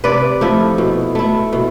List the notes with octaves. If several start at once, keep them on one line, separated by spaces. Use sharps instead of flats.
C3 B4 D5
F3 A3 E4
B2
A3 E4
B2